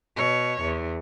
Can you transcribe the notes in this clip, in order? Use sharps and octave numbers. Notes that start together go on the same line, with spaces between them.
B2 C#5
E2